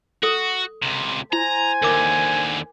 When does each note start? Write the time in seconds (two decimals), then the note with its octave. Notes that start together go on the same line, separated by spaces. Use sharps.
0.23 F#4 A4 D#6
0.83 C#2 C3
1.33 E4 C5 G#5 A#5
1.82 D#2 D3 A#4 D6